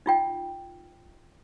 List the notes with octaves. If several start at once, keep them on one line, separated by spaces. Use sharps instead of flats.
D#4 F4 G5